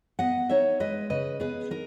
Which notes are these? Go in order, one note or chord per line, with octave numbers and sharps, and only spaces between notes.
B3 D#5 F#5
D#4 C#5 E5
G#3 B4 D#5
C#3 B4 D#5
B3 G#4 B4
D#4 A#4